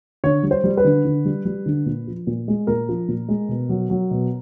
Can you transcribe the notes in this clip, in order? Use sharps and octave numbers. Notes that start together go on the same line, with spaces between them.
D3 C#5
G3
C5
G3
B4
D3
D3
G3
G3
D3
A#2
F3
A#2
G#3
A#2 A#4
F3
A#2
G#3
B2
F#3
F#3
B2